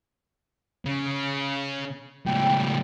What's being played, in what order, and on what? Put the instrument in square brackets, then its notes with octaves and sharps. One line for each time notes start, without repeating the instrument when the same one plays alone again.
[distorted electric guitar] C#3
[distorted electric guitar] C#2 A2 [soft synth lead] G5